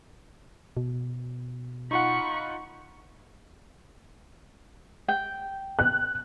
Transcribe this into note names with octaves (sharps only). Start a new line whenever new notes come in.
B2
D#4 F4 F#5 B5 C#6
G5
F#6